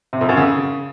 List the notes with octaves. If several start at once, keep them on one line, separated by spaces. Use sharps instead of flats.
C3
F2
F#2
C#3